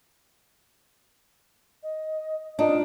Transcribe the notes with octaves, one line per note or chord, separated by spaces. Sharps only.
D#5
D4 D#4 F4